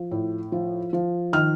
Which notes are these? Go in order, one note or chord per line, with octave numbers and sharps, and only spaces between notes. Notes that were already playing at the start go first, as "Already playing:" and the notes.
Already playing: F3
A2
F3
F3
D#3 F6